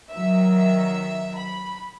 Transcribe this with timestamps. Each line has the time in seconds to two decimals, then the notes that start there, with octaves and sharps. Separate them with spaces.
0.11 D#3 F#3 E5
1.37 B5